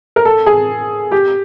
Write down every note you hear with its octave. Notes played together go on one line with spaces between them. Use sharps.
A#4
A4
G#4
G4